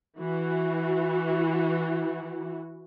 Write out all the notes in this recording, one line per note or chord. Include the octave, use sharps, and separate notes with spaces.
E3 F#4